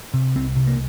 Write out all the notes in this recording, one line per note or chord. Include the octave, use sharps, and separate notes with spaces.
C3
C2 C4
C3
A#3